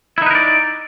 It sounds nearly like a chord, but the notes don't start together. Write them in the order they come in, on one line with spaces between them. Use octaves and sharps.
E4 D#4 B4 A#4 D5